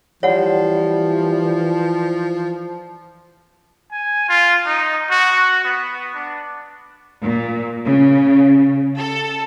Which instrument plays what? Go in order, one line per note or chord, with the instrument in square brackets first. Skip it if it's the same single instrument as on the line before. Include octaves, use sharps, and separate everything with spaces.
[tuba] E3 [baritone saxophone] F3 [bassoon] G3 [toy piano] C#5 F#5
[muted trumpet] G#5
F4
D#4
F#4
B3
D4
[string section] A#2
C#3
A4